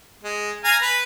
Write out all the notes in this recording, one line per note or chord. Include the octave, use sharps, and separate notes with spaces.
G#3
F5 G#5 A#5
B4